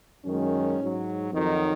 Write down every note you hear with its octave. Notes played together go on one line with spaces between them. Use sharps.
F#2 D#3 G#3 C#4
G#2 F#3
F2 D#3 F#3 D#4